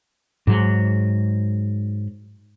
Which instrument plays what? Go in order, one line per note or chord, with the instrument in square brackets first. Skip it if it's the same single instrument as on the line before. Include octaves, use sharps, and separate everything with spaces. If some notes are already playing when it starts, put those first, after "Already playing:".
[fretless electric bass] G#2 F#3